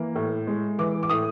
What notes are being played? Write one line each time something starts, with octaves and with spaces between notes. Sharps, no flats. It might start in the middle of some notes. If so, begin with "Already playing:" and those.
Already playing: E3 A#3
A2
G#3
E3 D6
D6
A2 D#6